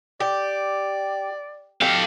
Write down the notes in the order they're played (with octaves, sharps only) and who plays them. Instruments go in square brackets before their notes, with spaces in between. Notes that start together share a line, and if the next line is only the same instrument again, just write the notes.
[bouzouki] G4 [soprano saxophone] D5
[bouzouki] G4 [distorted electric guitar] A4 F5